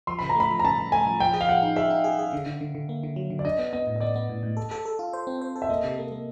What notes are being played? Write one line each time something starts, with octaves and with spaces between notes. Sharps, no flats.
F3 C6
C#3 B5
A#5
A3 B5
F3
A#5
C#3 A5
C#3
A3 G#5
F3
F3 G5
G#4
F5
F3 F#5
D#4
G#4 E5
D#4
G#4
G#4
D3
D3
D3
D3
A#3
D3
F#3
D3
D5
D4 D#5
B3
B3 D#5
A2
D#5
B3 D5
B3
A2
A2
A4
A4
A4
F4
C5
C4
C5
A4
E5
A#3 D#5
C3
A#3
A#3